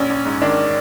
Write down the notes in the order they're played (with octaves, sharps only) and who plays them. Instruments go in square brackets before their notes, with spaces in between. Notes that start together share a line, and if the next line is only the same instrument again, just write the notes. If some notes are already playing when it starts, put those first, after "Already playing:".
Already playing: [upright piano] A#1 C#4
A#1
G#2
D#3 D4